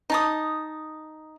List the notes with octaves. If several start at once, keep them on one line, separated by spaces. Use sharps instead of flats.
D#4 A5 D#6